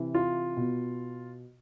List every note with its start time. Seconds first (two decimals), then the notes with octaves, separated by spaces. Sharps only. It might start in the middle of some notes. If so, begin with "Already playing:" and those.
Already playing: C3 E3
0.15 F4
0.57 B2